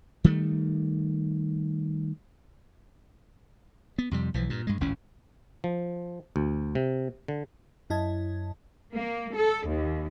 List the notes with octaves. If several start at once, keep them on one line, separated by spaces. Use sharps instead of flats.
D#3 G3 A3
B3
F2 C3 G3
B1 E3 F3
G2 A#2
G2 G#3
G#1 C#2 A2 C#4
F3
D2
C3
D3
F#2 E4 D#5 A5 G#6
A#3
A4
D#2